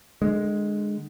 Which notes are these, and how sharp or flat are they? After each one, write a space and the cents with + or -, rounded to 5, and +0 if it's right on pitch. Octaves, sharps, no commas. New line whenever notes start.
D3 +25 G#3 +0